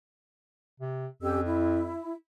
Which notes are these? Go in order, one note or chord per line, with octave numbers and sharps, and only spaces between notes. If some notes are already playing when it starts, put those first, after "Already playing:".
C3
F2 C#4 G4 E6
E4